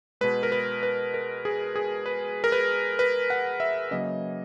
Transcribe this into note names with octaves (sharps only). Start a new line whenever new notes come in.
B2 G#3 B4
A#4
B4
B4
A#4
G#4
G#4
B4
A#4
B4
B4
F#5
E5
C#3 F#3 A#3 D#5